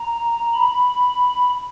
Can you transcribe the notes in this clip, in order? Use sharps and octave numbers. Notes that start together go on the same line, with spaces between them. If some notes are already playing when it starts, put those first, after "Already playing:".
Already playing: A#5
B5